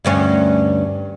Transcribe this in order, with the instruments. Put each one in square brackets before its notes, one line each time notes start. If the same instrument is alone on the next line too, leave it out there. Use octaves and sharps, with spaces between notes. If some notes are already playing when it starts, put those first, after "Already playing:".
[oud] D2 G2 C#4